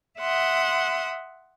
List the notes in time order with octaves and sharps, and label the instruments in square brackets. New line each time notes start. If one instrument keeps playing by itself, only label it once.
[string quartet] E5 F#5 C6 D#6